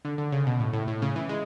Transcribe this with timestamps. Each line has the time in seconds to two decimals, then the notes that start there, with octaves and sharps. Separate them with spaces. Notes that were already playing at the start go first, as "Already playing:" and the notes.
0.05 D3
0.18 D3
0.32 C#3
0.47 B2
0.60 A2
0.73 A2
0.88 A2
1.02 C#3
1.16 E3
1.29 G#3